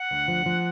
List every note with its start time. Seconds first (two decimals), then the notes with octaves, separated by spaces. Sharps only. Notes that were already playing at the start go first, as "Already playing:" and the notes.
Already playing: F#5
0.11 D2
0.28 F3
0.46 F3